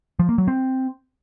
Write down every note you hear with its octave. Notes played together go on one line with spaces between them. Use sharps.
F3
A#3
F#3
C4